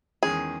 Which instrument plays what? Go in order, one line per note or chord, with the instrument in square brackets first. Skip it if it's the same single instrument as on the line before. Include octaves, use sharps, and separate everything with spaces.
[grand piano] E2 D#3 G#3 C#4 [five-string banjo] G#4